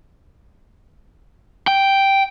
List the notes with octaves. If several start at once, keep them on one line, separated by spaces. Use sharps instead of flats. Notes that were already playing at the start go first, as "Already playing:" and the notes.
G5